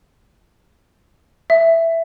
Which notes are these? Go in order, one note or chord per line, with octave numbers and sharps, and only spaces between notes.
E5